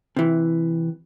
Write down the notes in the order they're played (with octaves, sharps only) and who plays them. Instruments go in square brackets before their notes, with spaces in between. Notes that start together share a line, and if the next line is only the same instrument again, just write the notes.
[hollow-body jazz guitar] C3 E3